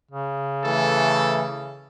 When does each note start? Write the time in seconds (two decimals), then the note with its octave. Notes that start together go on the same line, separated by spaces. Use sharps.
0.11 C#3
0.64 E3 A3 A4